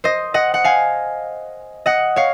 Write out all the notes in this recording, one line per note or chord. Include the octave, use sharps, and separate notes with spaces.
C5 D#5
D#5 F#5
F#5
F5 G#5
D#5 F#5
C#5 F5